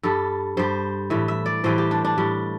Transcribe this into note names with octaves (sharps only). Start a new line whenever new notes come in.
G2 G3 A4
G2 G3 C5
A2 E3 G3 E5
E5
D5
A2 E3 G3 C5
G4
D4
D4
A2 G3